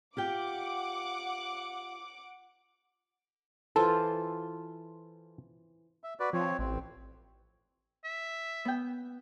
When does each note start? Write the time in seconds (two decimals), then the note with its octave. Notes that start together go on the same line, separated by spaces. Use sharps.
0.17 F4 G4 F#5 G5 D6
3.76 E3 F4 A4 C5
6.04 E5
6.20 F#4 B4 D5
6.33 F3 C4 C#5
6.59 A1 C4
8.04 E5
8.65 B3 G5